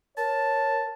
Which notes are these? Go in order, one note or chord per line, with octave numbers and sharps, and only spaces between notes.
A#4 C#5 A5